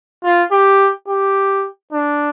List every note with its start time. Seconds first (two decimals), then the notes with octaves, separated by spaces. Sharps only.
0.24 F4
0.51 G4
1.08 G4
1.92 D4